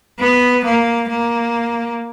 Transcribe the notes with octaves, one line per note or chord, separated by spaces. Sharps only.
B3
A#3
A#3